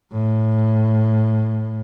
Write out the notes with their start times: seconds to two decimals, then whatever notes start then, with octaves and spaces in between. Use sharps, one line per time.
0.14 A2